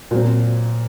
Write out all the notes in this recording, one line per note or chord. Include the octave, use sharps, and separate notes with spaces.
A#2 F#3 C4